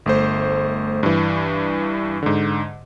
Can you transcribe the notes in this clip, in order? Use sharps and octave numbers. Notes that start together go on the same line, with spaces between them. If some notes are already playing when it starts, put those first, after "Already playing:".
G1 A3 C5
G2 E3
G#2 D3